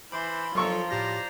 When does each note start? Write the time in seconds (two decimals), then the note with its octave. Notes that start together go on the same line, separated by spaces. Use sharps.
0.12 E3 C5 B5 C6 D6
0.55 F3 F#3 F4 A4 A#4 C6 C#6 E6
0.90 A2 G4 C5 D5 A#5 A#6